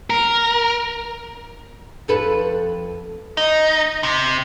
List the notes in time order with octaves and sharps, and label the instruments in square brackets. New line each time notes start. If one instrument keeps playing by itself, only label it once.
[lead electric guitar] A#4
[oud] F2 A4 B4
[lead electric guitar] D#4
C3